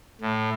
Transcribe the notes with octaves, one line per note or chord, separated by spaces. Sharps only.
A2